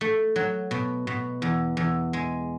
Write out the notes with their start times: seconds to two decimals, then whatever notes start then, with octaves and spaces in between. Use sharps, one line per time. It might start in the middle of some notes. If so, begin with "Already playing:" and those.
0.01 A3
0.36 F#3
0.71 B2
1.07 B2
1.42 E2
1.77 E2
2.13 G#3